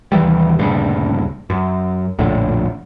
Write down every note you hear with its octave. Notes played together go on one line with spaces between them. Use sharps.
D#2 C3 E3 G3
D#1 D2 G2 C#3
F#2
A#1 F2 A2 D3